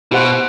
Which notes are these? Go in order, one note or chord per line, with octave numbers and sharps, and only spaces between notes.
B2 E4 G4 C5 F#5